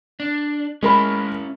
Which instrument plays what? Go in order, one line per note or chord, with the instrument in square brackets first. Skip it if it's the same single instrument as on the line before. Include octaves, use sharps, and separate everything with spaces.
[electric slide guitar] D4
[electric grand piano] G#3 A#4 B5 [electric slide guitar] C#4 E4